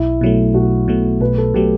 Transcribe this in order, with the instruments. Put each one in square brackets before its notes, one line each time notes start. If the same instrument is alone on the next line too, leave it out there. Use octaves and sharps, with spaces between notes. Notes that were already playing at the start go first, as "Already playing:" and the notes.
Already playing: [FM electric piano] B1 [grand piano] E4
[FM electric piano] B2 F#3 A3
[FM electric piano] B1 [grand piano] F#4
[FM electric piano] B2 F#3 A3
[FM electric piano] B1 [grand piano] B4
[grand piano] A4
[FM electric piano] B2 F#3 A3 [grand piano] G4